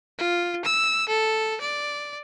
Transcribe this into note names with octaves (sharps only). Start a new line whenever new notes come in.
F4
E6
A4
D5